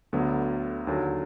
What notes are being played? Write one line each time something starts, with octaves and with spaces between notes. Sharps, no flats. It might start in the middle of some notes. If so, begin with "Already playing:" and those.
D2 D3 F#3 B3
D#2 D3 F#3